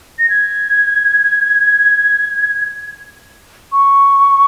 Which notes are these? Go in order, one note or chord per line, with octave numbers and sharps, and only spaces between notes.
A#6
G#6
C#6